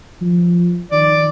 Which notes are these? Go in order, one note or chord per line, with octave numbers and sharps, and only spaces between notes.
F3
D#3 D5